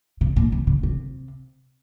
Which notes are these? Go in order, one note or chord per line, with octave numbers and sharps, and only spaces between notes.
C3
A#2
C3
C#3
C3